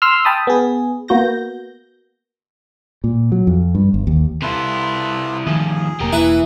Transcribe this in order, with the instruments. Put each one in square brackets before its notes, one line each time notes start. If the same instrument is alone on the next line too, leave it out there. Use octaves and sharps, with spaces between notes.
[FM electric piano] C6 E6 F6
G5 A5 B5 D#6
B3 G#4
[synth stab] A#3 B3 F#4 G6 A#6
[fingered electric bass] A#2
F#3
F2
G2
G1
D#2
[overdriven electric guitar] C3 E4 [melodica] F4 A4 B4
[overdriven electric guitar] D2 F3 [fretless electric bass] D#3 [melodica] G#4
[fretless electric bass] E1 A#3 [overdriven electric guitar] G4 A#4
[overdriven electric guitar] E3 [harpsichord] E4 B4